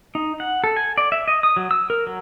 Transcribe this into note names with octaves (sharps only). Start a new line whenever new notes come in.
D#4
F#5
A4
G#5
D5
E5
D#5
D#6
F#3
E6
A#4
F#3